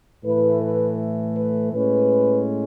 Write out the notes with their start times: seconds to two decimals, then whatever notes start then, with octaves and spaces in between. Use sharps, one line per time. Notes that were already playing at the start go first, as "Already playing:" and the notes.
0.24 A2 E3 A3 B4
0.61 B4
1.36 B4
1.73 A2 G#3 C#4 B4